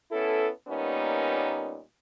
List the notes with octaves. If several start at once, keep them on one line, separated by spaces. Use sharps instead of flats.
B3 C#4 E4 A4
A#2 G3 A#3 B3 C#4 D#4